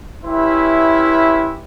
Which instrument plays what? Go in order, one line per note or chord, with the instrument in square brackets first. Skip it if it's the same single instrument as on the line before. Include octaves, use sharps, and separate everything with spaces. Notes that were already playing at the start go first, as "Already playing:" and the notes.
[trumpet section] C#4 E4 G4 B4 E5 C6